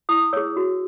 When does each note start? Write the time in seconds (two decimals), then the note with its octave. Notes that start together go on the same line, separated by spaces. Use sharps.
0.09 E4 D#6
0.33 G#4 C#5 E6
0.57 F#4